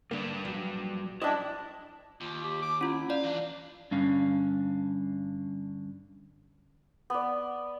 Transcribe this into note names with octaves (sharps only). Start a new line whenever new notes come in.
D3 G3 A#3 B4 D5
A#1 F#3
D4 E4 D#5
D#2 F4
G4
D6
C#4 E4 F4
D5 F5
E3 D4
G2 D3 C#4 F5
B3 D5